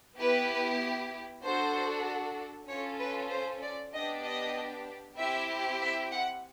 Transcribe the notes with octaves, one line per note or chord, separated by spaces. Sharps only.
B3 E4 G4 B4
D4 F#4 A4 C5
C#4 F4 A4 C#5
B4
C5
D5
B3 D4 G4 D#5
D#5
C4 E4 G4 E5
E5
F#5